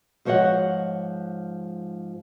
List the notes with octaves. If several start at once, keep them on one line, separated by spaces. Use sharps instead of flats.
G#2 F3 C5 C#5 D#5 F#5